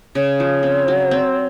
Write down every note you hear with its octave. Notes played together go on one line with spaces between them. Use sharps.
C#3 C#5
F3
C4
F#3
C4